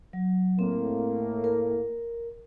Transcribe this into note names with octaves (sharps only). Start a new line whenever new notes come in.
F#3
A2 A#3 C4
A#4